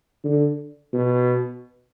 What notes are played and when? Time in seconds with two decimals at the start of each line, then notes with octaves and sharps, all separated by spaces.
0.24 D3
0.93 B2